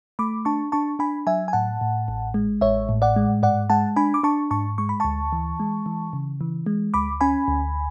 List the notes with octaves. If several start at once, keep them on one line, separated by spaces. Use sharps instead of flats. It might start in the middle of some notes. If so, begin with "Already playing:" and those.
A3 B5 D6
D4 A5 C#6
D4 A5 C#6
D4 G#5 B5
F#3 E5 G#5
G#5
A2 F#5 A5
A2
A1
G#3
A1 C#5 E5
A2
D5 F#5
G#3
G#2 D5 F#5
G#3 F#5 A5
D4 G#5 B5
D6
D4 A5 C#6
G#2 A5 C#6
G#3 C#6
B5
D2 A5 C#6
E3
G#3
E3
C#3
E3
G#3
D2 B5 D6
C#4 G#5 B5
D2